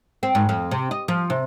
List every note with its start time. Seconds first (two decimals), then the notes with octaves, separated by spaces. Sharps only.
0.23 C4
0.35 G#2
0.49 F2
0.71 C3
0.91 D#5
1.08 F3
1.30 C3